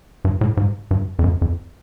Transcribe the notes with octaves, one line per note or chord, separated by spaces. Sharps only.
G2
A2
G#2
G2
F2
F#2
F2